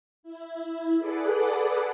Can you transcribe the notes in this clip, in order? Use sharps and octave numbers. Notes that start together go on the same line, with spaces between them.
E4
G#4 A4 B4 D5 F#5